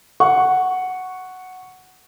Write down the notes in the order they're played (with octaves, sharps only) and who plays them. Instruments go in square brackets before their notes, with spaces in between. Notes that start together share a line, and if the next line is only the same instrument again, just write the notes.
[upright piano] F#5 C#6